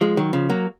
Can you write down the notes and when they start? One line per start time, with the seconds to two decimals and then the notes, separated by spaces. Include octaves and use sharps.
0.01 F3 G#3
0.17 D#3 F#3
0.33 C#3 F3
0.50 F#3 A#3